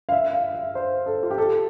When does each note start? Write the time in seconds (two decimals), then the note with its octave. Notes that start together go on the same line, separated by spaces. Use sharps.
0.09 F5
0.12 E5
0.33 F5
0.55 E5
0.75 C5
1.06 A4
1.23 F4
1.31 G4
1.38 A4